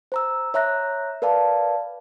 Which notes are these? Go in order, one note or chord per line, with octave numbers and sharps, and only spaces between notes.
C5 A#5 E6
C#5 E5 A#5 F#6 A#6
A#4 B4 D5 F5 A5